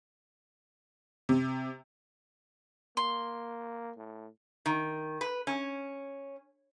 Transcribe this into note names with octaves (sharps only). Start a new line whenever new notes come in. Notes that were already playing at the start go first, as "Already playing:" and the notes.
C3
A#3 C6
A2
D#3
B4
C#4